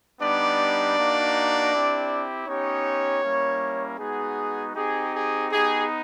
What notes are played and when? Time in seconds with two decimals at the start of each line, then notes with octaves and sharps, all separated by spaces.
0.20 G3 B3 D4 D#4 G4 D5
0.97 A#3 D#4 F#4
1.71 C4 E4 G4
2.47 B3 C#4 D#4 G4 C#5
3.23 G3 A#3 C#4 E4
3.98 G#3 B3 D#4 F#4 G#4
4.75 C4 D#4 G4 G#4
5.13 G#4
5.51 B3 D#4 G4 G#4